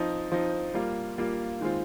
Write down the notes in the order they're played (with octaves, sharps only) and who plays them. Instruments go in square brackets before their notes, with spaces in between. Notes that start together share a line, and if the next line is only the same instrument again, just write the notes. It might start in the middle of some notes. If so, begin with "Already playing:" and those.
Already playing: [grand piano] F3 C4 D#4
F3 C4 D#4
G3 A#3 F4
G3 A#3 F4
D#3 G#3 C4 F4